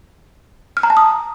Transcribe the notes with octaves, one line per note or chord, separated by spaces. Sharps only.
F6
A#5
A5
D#6